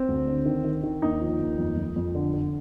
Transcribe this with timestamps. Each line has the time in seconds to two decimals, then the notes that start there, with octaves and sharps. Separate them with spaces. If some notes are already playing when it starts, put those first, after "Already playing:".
Already playing: C4
0.08 D2
0.27 D3
0.46 D#3
0.64 D#3
0.83 D#3
1.02 D#2 D#4
1.21 F3
1.39 D#2
1.58 F2
1.77 F2
1.96 F2
2.15 D3
2.34 D3